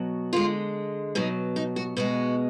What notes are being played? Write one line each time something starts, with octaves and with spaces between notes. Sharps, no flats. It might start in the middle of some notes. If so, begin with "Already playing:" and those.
Already playing: B2 F#3
D3 G#3 F4
B2 F#3 D#4
D#4
F#4
B2 G#3 F#4